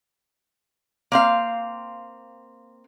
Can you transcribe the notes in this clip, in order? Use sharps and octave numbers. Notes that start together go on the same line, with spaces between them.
A#3 C4 F5